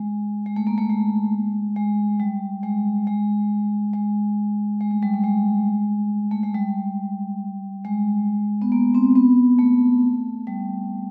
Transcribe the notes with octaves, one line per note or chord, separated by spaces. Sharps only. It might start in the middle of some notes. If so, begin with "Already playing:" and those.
Already playing: G#3
G#3
A3
A#3
A3
G#3
G#3
G3
G#3
G#3
G#3
G#3
A3
G3
A3
G#3
A3
G#3
G3
G#3
B3
A#3
C4
B3
A3
G3